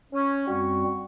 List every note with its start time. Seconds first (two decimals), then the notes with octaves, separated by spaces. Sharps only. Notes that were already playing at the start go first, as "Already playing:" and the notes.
0.13 C#4
0.47 F#2 G3 C4 F#4 C#6